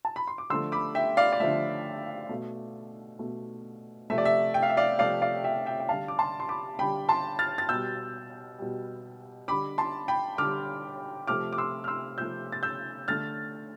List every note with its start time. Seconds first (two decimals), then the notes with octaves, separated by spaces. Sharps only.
0.05 A5
0.16 B5
0.28 C6
0.38 D6
0.50 D3 F3 A3 C6 E6
0.72 B5 D6
0.95 E5 G5
1.17 D5 F5
1.32 D5
1.40 D3 F3 A3 E5
2.29 B2 A3
3.19 B2 A3
4.10 C3 F3 A3 E5
4.18 D5
4.25 E5
4.54 G5
4.63 F5
4.69 E5
4.77 D5 F5
4.99 C3 F3 A3 D5 F5
5.22 D5 F5
5.44 E5 G5
5.66 E5 G5
5.80 G5
5.89 D3 G3 F5 A5
6.08 D6
6.19 A5 C6
6.40 C6
6.49 B5 D6
6.79 D3 G3 G5 B5
7.09 A5 C6
7.39 F6 A6
7.58 A6
7.69 B2 G3 E6 G6
8.59 B2 G3
9.48 D3 G3 B5 D6
9.78 A5 C6
10.08 G5 B5
10.38 D3 G3 D6 F6
11.27 C3 F3 A3 D6 F6
11.53 D6
11.58 C6 E6
11.84 F6
11.88 C6 E6
12.18 C3 F3 A3 E6 G6
12.52 A6
12.63 E6 G6
13.08 D3 A3 F6 A6